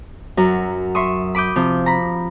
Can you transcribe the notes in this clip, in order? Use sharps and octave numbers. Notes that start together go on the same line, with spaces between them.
F#2 F#3 A#5
E5 C6 C#6 D#6
B5 D6 D#6 G6
C3 F3 G6
A#5 B5